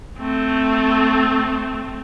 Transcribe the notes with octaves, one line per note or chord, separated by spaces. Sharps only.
A3 C4